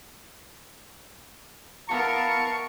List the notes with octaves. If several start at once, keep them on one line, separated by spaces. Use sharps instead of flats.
B3 E4 A#4 F5 A5 C#6